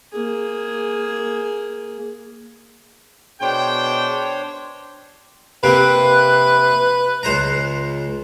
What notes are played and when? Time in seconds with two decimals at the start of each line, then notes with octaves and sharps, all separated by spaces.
0.13 A#3 G#4
3.41 B2 D4 G#4 C5 C#5 G5
5.64 C3 A#3 C4 B4 F#6
7.23 C#2 C5 A#5